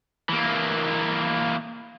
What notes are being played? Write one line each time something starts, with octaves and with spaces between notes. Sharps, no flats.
E3 A#3